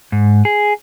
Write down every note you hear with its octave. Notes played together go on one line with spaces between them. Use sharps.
G#2
G#4